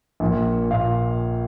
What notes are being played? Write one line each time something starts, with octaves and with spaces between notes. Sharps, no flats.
A#1 A#2
A#2 F5